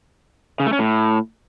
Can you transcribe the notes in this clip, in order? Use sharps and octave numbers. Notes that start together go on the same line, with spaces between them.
C#3
A3
C#4
A2